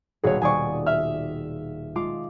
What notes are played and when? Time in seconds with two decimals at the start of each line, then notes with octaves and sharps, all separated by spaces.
0.24 D#1 B2 F#4 G#4 C#5
0.42 D#1 G#4 D5 G#5 C#6
0.87 E5 F6
1.95 G#3 F4 D6